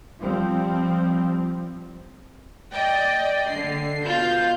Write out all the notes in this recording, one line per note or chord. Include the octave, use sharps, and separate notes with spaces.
F3 G3 C4
D5 D#5 G5
D3 C7
B2 F4 G6